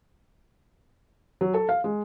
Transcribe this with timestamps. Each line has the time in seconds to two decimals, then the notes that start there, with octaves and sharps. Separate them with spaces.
1.41 F#3
1.54 A4
1.69 F5
1.84 G#3